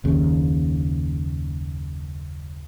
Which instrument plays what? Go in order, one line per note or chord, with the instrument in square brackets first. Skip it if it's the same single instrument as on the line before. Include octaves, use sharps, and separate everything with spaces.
[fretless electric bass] F#1 D#2 C#3